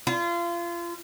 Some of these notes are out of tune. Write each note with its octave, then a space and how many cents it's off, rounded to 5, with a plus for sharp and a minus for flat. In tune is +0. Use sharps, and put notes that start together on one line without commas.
F4 -30